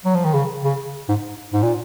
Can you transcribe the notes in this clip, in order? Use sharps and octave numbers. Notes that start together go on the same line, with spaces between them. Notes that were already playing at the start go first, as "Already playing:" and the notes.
F#3
F3
D#3
C#3
C#3
G#2
G#2
A#2